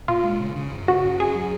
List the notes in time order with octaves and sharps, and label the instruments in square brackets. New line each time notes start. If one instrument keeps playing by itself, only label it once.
[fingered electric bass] A#2 [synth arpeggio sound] F4
[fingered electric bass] G#3
C#3
C#3
F#2
[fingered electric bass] C#3 [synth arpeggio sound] F#4
[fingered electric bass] F#2
[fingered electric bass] C#4 [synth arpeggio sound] G#4
[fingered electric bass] F#3